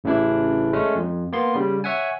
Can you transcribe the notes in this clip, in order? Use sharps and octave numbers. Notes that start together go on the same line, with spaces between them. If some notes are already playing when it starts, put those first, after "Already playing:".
A1 C#3 E3 D4 E4
G#3 A3 C#4
F2
A#3 B3 C6
C#3 G3
C#5 E5 F#5 G#5